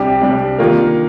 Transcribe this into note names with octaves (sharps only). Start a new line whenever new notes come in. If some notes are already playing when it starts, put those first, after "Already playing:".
Already playing: C2 C3 G3 D4 G4
C2 C3 G3 D4 G4
D#3 A#3 D4 F4 A#4